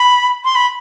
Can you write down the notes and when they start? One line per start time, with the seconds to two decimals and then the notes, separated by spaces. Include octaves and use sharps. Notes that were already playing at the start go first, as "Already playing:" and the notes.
Already playing: B5
0.44 C6
0.55 B5